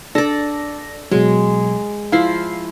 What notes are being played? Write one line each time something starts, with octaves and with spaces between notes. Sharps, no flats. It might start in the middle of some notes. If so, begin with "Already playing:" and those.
D4 A4 D5 A#6
B2 F#3 G#3
F3 E4 F5 C7